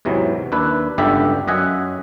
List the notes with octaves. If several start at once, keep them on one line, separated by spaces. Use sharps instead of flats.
E2 G#2 C3 E3 F#3
D#2 D4 B4 E5
G1 C#2 G2 D3 G4 E5
F#2 D#5 E5 F#5 G#5